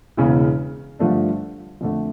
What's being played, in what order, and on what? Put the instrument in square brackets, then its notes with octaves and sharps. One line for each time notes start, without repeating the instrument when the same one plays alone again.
[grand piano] E1 E2 C#3
G2 D3 F3 A3 D4
F2 D3 A3